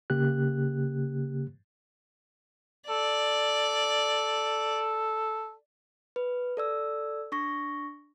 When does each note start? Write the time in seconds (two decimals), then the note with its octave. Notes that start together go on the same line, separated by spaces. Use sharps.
0.10 C#3 A#3 G4 F#6
2.89 A4 D5
6.16 B4
6.57 A4 D5 E6
7.32 D4 C#6 A#6